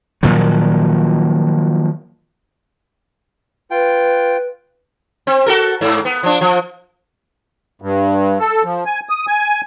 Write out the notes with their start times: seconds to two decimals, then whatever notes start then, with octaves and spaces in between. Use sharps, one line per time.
0.23 A#2 D#3 F3 F#3
3.71 F4 B4 G5
5.27 C4
5.46 F#4 A4 A#4
5.81 G#2
6.05 B3
6.23 F3 D4
6.41 F3
7.82 G2
8.40 A4
8.63 F3
8.86 G#5
9.09 D#6
9.27 G#5